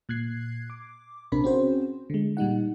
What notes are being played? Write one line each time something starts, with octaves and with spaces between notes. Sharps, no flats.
A#2 F#6 G#6 C7
D6
A#1 C3 C4 D4 A#4 B5
C4 C#4 F#4 G#4 C5
D3 G#3
A#2 G3 D#4 F#5